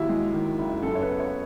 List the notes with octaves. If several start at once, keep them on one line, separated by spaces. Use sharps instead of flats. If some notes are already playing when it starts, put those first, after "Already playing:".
Already playing: D#2 F#3 E4
G#3
D#3
F#1
F#2 A4
C#5
B4
B3
C#5